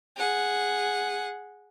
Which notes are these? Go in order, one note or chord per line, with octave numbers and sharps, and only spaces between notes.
G#4 F#5